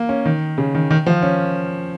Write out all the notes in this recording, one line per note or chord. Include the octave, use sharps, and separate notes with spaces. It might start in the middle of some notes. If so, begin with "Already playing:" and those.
Already playing: A#3
C#4
D#3
C#3
D#3
D#3
F3
C#4